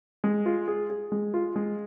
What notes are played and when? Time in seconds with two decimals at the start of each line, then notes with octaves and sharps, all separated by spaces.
0.24 G#3
0.46 F4
0.68 G#4
0.90 G#4
1.12 G#3
1.34 F4
1.56 G#3